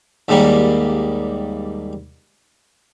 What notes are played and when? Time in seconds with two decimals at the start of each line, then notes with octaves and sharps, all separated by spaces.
0.28 D#2 G#2 G3 A#3